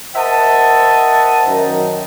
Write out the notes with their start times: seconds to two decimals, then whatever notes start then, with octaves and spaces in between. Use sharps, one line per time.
0.15 A#4 C5 D#5 E5 F#5 A5
1.46 F#2 D#3 D#4